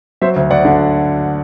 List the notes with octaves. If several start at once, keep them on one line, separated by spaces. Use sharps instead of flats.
F#3 C5 E5
D2
D2 D5 F#5
D3